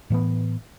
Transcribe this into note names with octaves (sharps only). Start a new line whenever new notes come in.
A2 E3 B3